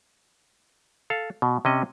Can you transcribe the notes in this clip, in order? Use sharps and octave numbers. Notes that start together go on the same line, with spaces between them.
A4 F5
B2
C3 C#4 D#5